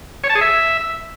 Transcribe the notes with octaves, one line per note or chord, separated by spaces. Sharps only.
C#5
A5
G#4
E5